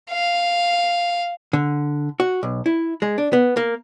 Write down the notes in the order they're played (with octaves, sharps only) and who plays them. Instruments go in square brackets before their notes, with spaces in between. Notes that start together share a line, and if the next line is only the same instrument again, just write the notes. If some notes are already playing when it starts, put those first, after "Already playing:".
[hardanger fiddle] F5
[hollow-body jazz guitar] D3
F#4
B1
E4
G#3
D4
B3
A#3